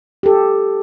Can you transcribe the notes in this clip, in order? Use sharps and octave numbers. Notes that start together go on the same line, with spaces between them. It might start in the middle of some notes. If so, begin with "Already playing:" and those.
G4 A4